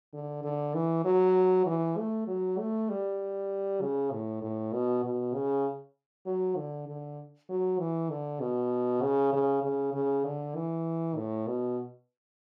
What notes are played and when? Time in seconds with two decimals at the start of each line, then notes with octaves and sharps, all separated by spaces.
0.13 D3
0.44 D3
0.75 E3
1.05 F#3
1.66 E3
1.98 A3
2.27 F#3
2.59 A3
2.90 G3
3.81 C#3
4.12 A2
4.42 A2
4.73 B2
5.04 B2
5.34 C#3
6.26 F#3
6.57 D3
6.87 D3
7.49 F#3
7.79 E3
8.10 D3
8.41 B2
9.02 C#3
9.33 C#3
9.63 C#3
9.94 C#3
10.25 D3
10.55 E3
11.16 A2
11.47 B2